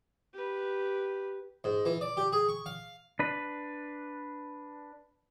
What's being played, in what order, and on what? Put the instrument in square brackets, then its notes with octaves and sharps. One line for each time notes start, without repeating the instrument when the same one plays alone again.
[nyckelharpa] G4 B4
[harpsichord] G#2
E3
D5
G4
G#4
C#6
F5
[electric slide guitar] D4 B4